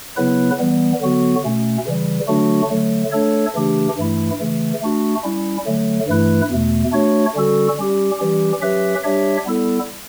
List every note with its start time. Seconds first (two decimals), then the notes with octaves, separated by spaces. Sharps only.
0.17 C#3 F#3 B3 E4 B4
0.59 E3 G3 B3
1.01 D3 F#3 B3 F#4
1.44 B2 A3 C#4
1.86 C#3 E3 G3
2.28 D3 F#3 A3 D4 F#4
2.70 D3 F#3 A3
3.12 A3 D4 A4 C#5
3.55 C#3 E3 A3 D4 G4
3.97 G2 E3 A3 E4
4.40 C#3 E3 A3
4.81 A3 D4 F#4
5.24 G3 C#4 E4
5.66 D3 F#3 A3
6.08 G2 E3 A3 E4 B4
6.50 E2 B2 A3
6.92 A3 D4 F#4 C#5
7.35 D3 G3 C#4 F#4 A4
7.77 G3 C#4 G4
8.19 E3 G3 C#4 G4
8.61 F#3 C#4 G4 B4 E5
9.03 G3 D4 G4 C#5 E5
9.46 G3 B3 E4 A4